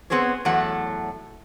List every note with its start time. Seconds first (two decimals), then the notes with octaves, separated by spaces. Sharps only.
0.10 B3 C4 G#4 C5 C#5
0.45 E2 A2 F#3 A3 F#5